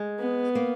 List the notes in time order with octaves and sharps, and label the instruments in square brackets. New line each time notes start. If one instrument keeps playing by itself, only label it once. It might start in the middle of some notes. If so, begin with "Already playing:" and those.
Already playing: [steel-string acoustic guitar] G#3
[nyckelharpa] B3
[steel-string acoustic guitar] A#3